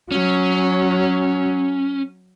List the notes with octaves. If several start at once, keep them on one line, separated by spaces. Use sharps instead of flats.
F#3 C#4